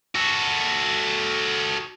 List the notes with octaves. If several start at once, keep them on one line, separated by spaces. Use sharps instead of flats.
F#4 A4